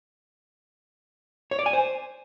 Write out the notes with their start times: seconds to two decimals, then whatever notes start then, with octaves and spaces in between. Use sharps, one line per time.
1.51 C#5
1.59 D5
1.66 G#5
1.73 C5